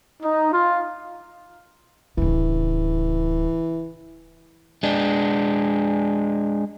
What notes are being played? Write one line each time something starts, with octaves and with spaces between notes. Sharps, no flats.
D#4
F4
D1 C#3 E3
G#3 D4